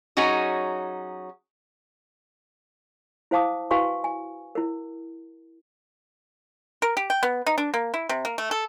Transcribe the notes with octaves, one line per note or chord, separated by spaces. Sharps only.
F#3 C#4 D#4 F#4 G#4
E4 C5 F5 A5 D6 D#6
E4 F#4 B4 F5 G#5 C#6
G#5
E4 A#4
A#4
G4
G5
B3
D#4
D4
A#3
E4
C3
A#3
A3
A4